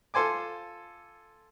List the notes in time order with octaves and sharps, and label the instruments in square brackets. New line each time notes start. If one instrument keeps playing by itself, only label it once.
[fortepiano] F4 A4 C5 G#5 D6